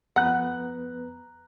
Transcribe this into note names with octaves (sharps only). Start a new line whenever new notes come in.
F2 B3 B4 F#5 A#5 F#6